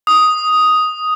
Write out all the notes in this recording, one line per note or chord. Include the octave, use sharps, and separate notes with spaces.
D#6